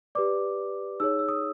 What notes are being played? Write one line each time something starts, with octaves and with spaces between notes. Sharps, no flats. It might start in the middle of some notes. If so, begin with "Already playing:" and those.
G4 B4 D5 D6
D#4 G#4 C#5 E6
E6
D#6